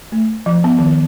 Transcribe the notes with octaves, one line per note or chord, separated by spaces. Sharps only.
A3
F3
B3
D#3